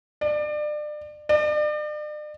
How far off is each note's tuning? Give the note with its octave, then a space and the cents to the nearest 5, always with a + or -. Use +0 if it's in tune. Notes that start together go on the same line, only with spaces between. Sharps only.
D5 +30
D5 +40